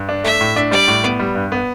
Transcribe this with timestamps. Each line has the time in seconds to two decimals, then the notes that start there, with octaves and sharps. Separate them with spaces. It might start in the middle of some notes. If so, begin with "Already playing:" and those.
Already playing: G2
0.09 D4
0.24 A3 E5
0.41 A2
0.56 D4
0.71 G3 D5
0.88 A2
1.04 B3
1.20 G3
1.35 G2
1.52 B3